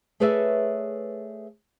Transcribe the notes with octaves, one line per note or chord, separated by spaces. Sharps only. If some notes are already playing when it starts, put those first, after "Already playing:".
A3 G#4 B4 C#5 D5 E5